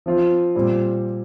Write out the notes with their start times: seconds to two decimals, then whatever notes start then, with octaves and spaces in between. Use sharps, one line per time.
0.06 F3 C4 F4
0.55 A#2 G3 C4